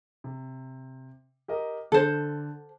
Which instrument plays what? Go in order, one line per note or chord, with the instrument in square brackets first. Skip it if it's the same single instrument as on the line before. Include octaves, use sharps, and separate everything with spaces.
[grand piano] C3
G4 A#4 D#5
[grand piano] D3 [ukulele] A4 C5